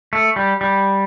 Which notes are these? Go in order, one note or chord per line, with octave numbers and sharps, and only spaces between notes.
A3
G3
G3